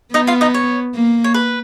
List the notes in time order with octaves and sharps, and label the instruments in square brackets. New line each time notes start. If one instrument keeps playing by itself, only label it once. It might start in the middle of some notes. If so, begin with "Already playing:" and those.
[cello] B3 [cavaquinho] D#4 D#5
[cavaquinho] F4 F5
D#4 D#5
C#5
[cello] A#3
[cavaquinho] C#5
B4